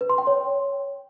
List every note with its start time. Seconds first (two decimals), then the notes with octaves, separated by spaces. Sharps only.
0.01 B4
0.10 C6
0.18 G5
0.27 C#5